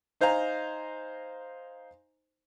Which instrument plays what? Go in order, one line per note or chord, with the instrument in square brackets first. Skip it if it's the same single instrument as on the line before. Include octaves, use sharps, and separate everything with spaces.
[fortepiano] D#4 C5 F5 G#5 A#5